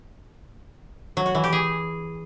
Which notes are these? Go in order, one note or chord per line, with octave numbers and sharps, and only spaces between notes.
F#3
F#4
E3
G4
G#4